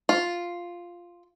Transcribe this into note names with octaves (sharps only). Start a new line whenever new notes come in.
F4